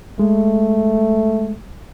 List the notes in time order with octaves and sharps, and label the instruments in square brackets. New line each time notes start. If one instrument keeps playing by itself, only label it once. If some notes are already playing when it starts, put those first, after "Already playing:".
[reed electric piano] G#3 [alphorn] A3